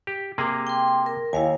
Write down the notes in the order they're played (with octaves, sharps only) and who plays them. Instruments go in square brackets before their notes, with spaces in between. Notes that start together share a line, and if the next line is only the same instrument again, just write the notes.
[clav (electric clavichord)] G4
C3 A#3 G#4
[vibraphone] G5 C6
A#4
[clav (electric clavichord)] D#2 [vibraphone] E4 F5 G#5